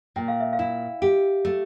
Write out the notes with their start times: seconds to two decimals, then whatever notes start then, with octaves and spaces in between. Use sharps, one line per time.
0.16 A#2 G5
0.28 F5
0.40 E5
0.53 F5
0.59 E4
1.02 G4
1.45 A3